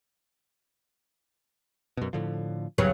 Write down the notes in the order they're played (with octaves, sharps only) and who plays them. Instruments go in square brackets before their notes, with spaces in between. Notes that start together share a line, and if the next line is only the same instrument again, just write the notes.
[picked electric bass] F#2 B2
A2 D3 F3
[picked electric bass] B1 E2 G3 [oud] C#3 F#3 B4